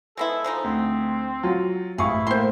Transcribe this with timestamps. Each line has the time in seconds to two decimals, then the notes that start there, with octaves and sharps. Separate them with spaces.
0.17 G#3 B3 E4 A4
0.44 F3 G#3 D#4
0.64 D2 C4
1.43 F#3 F4
1.98 A1 E4 G#4 F5 C#6
2.27 A2 A#3 C5 C6